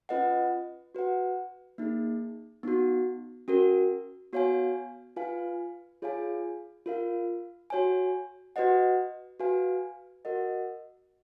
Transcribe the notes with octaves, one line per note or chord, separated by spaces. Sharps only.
C#4 F4 B4 D#5 F#5
F#4 B4 F#5
A#3 D#4 G#4
B3 D#4 F#4
C#4 F#4 A#4
B3 F#4 C#5 F5 G#5
F4 B4 F5 G#5
F4 G#4 C#5 F5 G#5
F4 A#4 F5
F#4 C#5 G#5
F#4 B4 D#5 F#5
F#4 B4 F5 G#5
F#4 A#4 D#5 F#5